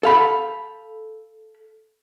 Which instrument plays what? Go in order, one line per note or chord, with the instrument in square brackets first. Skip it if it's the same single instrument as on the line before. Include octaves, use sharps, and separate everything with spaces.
[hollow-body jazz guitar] A4 F5 B5